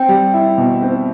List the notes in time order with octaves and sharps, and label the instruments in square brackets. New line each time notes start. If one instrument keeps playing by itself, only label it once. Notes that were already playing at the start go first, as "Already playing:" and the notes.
Already playing: [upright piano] C4 [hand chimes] G5
[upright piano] G3
E4
B2
C4